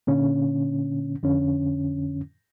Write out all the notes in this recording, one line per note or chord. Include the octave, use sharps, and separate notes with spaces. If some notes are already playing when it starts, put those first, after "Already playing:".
A#2 D3 C#4
F2 D3 C#4